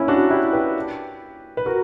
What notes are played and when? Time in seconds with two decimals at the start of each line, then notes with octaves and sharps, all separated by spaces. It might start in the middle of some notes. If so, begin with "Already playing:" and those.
Already playing: A#3 C#4 E4
0.08 D4 F#4
0.30 E4 G4
0.53 G4 B4
1.57 B4
1.66 F#4 A#4